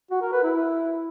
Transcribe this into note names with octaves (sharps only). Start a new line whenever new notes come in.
F#4
A#4
B4
E4